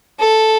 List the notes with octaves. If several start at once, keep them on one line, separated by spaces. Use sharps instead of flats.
A4